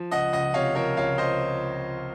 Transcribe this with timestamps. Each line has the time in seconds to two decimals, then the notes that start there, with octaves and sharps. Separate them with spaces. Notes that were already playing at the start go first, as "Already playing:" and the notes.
Already playing: F3
0.11 C#2 D#5 F#5
0.32 C#2 D#5 F#5
0.54 C3 C#5 F5
0.75 F3 A#4 C#5
0.97 C#2 C#5 F5
1.18 C5 D#5